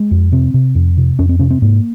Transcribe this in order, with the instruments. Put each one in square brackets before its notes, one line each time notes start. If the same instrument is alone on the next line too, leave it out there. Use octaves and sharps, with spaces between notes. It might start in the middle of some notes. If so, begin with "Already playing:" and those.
Already playing: [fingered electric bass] G#3
F2
C3 C4
C3
F2
C3
F2 C#4
C4
C3 C#4
C4
G#2 A#3